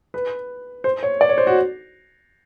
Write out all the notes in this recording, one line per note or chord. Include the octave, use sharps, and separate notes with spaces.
B4
C5
C#5
D5
C#5
C5
F#4